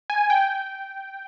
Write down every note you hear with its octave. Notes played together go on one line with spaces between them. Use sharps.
G#5
G5